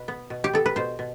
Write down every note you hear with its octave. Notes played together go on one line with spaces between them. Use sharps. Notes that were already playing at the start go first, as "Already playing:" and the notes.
Already playing: B2 B4
B3
B2
G4
B3 A4
B4
B2 C5
B2